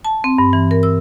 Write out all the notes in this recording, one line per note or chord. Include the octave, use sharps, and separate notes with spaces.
A5
C4
G2
E3
A#4
E6